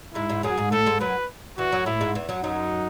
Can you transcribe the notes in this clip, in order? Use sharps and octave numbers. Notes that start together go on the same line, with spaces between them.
G#2 G#3 E4
G#2 G#3
F#2 F#3 G#4
G#2 G#3
A2 A3 A4
G#2 G#3
F#2 F#3 B4
E2 E3 F#4
F#2 F#3
A2 A3 E4
G#2 G#3
E2 E3
F#2 F#3
F#2 F#3 D#4